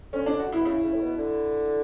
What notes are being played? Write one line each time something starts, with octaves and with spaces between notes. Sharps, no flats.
D3 C#4
D4
F#4
E4
B2
C#3 E4
C#3
A2
B2
D3